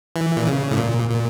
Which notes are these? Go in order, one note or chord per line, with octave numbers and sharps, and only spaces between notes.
E3
A#2
C#3
A2
A#2
A#2